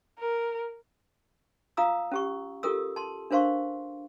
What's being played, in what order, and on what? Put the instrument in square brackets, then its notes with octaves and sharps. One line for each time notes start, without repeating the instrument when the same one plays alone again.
[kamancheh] A#4
[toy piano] F4 F5 A#5 D#6 E6
C#4 G4 C#6
F4 G4 A4 A#4 D#6 E6
A5 C6
D4 A#4 C5 F5 C6 C#6